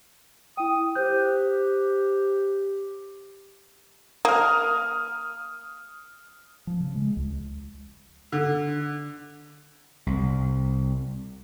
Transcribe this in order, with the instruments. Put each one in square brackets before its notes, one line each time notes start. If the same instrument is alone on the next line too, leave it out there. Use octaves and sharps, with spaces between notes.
[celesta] E4 G5 [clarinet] D#6
[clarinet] G4 [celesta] C5 F#6 G6
[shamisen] A#3 [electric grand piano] D#6 F6
[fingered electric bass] F3
C#3
G#3
C#2
[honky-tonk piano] D3
[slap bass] C2